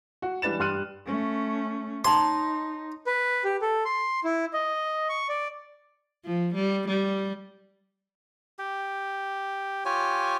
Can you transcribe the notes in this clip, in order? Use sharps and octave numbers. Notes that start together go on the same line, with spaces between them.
F#4
E3 G3 D4 B4 A6 E7
G2 G4 C6 F6 F#6 D#7
A3 C#4
D#4 C#5 A5 A#5 C6
B4
G4
A4
C6
E4
D#5
C#6
D5
F3
G3
G3
G4
F4 G4 C#5 G#5